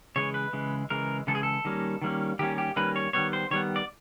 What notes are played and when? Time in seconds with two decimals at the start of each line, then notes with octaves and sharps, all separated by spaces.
0.16 C#3 E3 G#3 C#5
0.34 B4
0.53 C#3 E3 G#3
0.90 C#3 E3 G#3 A#4
1.27 C#3 E3 G#3 A4
1.35 G#4
1.43 A4
1.65 D#3 G3 A#3 C#4
2.02 D#3 G3 A#3 C#4
2.39 D#3 G3 A#3 C#4 G4
2.58 G4
2.76 D#3 G3 A#3 C#4 B4
2.96 C#5
3.13 D#3 G3 B3 C#5
3.33 C5
3.51 D#3 G3 B3 C#5
3.76 D5